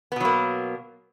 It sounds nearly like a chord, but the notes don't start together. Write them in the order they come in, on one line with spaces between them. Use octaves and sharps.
B3 B2 F#3 A#3